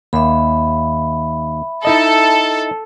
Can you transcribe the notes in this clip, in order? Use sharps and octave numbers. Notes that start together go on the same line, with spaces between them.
D#2 E5 B5
D#4 E4 A4 D#5